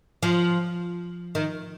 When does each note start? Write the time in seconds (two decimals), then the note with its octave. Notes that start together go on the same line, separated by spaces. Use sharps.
0.23 F3
1.35 D#3